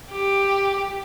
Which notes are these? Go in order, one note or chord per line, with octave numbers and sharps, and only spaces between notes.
G4